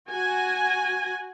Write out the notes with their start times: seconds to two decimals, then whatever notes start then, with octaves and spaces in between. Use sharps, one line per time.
0.10 F#4 G#5